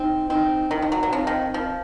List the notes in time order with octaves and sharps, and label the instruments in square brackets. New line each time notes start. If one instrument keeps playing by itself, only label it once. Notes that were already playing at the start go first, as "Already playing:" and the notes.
Already playing: [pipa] C4 [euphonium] D#4
[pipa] C4 [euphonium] D#4
[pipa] D#3 [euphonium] D#4
[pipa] F3
F#3
F#3
[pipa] F3 [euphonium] C4
[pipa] D#3
F3